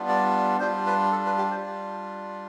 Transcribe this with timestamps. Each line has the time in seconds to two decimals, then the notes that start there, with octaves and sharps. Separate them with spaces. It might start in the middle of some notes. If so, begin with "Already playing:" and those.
Already playing: G3 B3 D4 F4
0.08 D5
0.59 G3 D4 F4 C5
0.86 B4
1.12 A4
1.26 B4
1.38 G4
1.51 C5